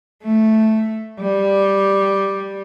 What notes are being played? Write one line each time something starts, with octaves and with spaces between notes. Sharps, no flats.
A3
G3